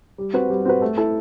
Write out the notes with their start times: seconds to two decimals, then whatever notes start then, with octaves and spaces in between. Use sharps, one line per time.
0.18 G3
0.33 C4 F#4 B4
0.50 G3
0.65 C4 F#4 B4
0.82 A3
0.97 E4 A4